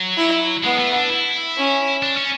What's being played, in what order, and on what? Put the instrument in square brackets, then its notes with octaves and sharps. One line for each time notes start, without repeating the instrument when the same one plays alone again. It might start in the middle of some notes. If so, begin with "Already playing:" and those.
Already playing: [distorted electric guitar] F#3
[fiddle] E4
[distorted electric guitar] G#3 [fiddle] B3
[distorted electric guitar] A3
D4
E4
[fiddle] C#4
[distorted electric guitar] D4
C#4